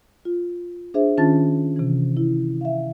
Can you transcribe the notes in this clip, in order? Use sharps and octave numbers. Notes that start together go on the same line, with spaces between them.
F4
D4 G#4 C5 E5
D#3 C#4 D4 F4 A5 A6
C3 E3
E4
E5 F5